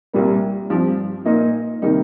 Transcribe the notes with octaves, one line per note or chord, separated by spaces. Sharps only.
C2 A#2 G3 A#3
G2 F3 C4
A#2 A#3 D#4 A#4 D#5
C3 D#3 G3 A#3 D#4